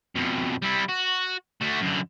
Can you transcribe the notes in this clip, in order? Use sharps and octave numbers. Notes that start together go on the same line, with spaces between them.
F2 B2
G3 E4
F#4
A3 F#4
F#2 D3